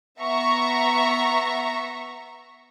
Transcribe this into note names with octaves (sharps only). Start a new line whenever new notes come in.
B3 E5 A#5 C#6